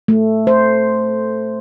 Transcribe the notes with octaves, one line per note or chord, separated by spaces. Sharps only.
A3
C5